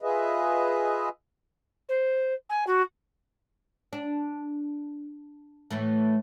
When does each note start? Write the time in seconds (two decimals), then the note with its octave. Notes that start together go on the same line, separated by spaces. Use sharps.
0.02 F4 G#4 B4 D#5 E5
1.89 C5
2.49 G#5
2.67 F#4
3.93 D4
5.71 A2 E3 A3